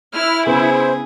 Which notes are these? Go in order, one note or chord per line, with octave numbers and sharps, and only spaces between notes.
E4 F6
C#3 B3 G#4 C5